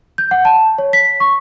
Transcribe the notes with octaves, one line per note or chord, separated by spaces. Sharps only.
G6
F#5
A5
C#5
B6
C#6